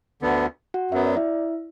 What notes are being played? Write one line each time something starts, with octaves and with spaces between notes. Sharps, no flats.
D2 D3 B3
F#4 F#5
F#2 F#3 B3 E5
D5
E4 E5